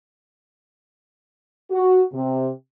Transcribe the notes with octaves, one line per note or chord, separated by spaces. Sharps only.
F#4
C3